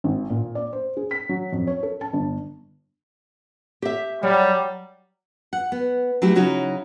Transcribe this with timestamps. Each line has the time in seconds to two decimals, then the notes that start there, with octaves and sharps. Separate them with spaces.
0.04 G#1
0.30 A#2
0.55 D5
0.73 C5
0.97 G#4
1.11 B6
1.29 F#3
1.52 F2
1.67 C#5
1.83 A4
2.01 A5
2.13 G1
3.82 G4 E5
4.23 F#3 G3
5.53 F#5
5.72 B3
6.22 F#3 A3 E4 F#4 G4
6.36 C#3 F#3 D#4 E4 F#4 C#5